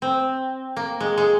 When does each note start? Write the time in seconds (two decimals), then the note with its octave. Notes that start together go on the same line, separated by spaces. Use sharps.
0.02 C4
0.76 A#3
1.00 G#3
1.18 G#3